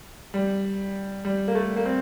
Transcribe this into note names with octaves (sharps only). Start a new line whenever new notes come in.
G3
G3
A#3
A3
A#3
C4